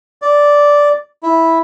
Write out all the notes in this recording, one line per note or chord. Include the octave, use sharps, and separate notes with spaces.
D5
E4